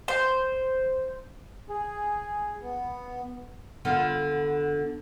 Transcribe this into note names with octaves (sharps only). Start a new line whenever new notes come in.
C5
G#4
B3
D3 B3 F4